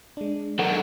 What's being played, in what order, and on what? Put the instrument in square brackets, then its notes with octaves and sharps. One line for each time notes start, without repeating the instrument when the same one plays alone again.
[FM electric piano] G#3 D4
[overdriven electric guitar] G#2 F#3 [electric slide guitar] A4 A#4 F#5